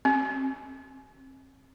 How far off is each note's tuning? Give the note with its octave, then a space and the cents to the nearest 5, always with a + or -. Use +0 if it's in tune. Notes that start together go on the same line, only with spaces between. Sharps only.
C4 +35